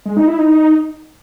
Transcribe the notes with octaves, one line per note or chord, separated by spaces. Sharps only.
G#3
D#4
E4
D#4